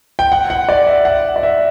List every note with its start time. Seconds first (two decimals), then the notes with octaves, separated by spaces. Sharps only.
0.19 G5
0.32 F#5
0.50 F#5
0.69 D5
0.87 E5
1.05 F#5
1.36 D5
1.43 E5